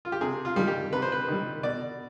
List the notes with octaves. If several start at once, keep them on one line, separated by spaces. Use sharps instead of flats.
F4
G4
C3 G#4
F4
D#3 G3
G4
C3 B4
C5
B4
D#3 G3
B2 D5